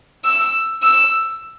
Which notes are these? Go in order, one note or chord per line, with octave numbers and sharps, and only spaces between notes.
E6
E6